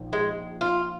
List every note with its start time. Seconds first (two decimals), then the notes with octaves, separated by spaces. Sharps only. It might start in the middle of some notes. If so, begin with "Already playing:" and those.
Already playing: A#1 A#2 F3 D#4
0.13 G#3
0.61 F4